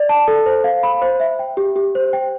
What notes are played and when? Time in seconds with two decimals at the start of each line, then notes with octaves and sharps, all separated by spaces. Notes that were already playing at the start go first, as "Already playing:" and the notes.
Already playing: D5
0.09 A5
0.28 A4
0.46 C5
0.64 F5
0.83 B5
1.02 C5
1.20 E5
1.39 G5
1.57 G4
1.76 G4
1.95 C5
2.13 G5